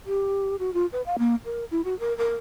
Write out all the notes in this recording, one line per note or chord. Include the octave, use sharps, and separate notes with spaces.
G4
F#4
F4
B4
F5
A#3
A#4
E4
F#4
A#4
A#4